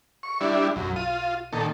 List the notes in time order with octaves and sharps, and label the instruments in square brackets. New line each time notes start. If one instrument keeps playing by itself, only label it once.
[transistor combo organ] C#6
G3 D4 E4
[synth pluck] B1 [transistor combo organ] F#2
[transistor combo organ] F4 [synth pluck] D#7
[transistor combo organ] A#2 D#3 A4